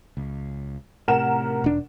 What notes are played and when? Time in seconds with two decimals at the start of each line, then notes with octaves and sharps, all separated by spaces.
0.17 C#2
1.08 A2 C3 A#4 F#5 E7
1.64 E1 D4